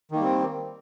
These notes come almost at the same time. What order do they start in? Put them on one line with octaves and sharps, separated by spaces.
D#3 A#3 G3 C4